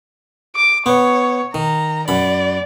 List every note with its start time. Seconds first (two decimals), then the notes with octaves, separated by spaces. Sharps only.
0.56 D6
0.86 B3 C#5
1.54 D#3 A#5
2.08 F#2 D5 B5